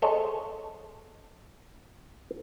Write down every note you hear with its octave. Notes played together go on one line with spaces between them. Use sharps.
G#4 A4 C5 C#5 D#5